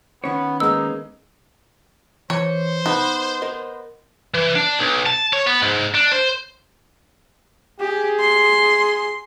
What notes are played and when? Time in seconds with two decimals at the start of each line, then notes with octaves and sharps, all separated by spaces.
0.24 D#3 B3 C#4 C#5
0.60 G#3 A#3 B3 D#4 E6
2.30 E3 C5 C#5
2.86 B3 D#4 B4
3.42 A#4 D#5
4.34 E3
4.56 D4
4.79 B1
5.06 A5
5.33 C#5
5.47 B3
5.62 G#2
5.95 D4
6.12 C5
7.80 G4 G#4
8.21 C6